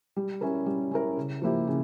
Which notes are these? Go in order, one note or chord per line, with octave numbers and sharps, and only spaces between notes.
G3
C#4 E4 A#4
G3
C#4 E4 A#4
C#3
F3 A#3 E4 G4
C#3